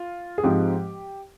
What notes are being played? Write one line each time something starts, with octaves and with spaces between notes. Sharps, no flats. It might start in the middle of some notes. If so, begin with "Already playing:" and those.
Already playing: F4
G#4
G#2 F3 G#3 C4 G4